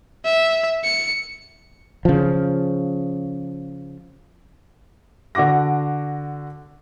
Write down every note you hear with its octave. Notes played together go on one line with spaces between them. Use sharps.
E5
C#7
C#3 F3
D3 F#4 F#5 D6 A#6